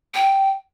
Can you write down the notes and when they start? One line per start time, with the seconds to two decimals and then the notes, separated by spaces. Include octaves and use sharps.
0.14 G5